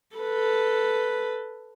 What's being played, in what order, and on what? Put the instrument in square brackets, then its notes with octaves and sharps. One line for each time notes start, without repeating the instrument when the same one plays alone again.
[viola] A4 B4